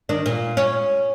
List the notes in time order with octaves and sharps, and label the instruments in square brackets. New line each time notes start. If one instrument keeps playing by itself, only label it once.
[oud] D#3 D4
A#2
C#4